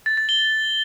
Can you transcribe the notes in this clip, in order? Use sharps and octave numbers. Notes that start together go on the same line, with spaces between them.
A6
A6
G7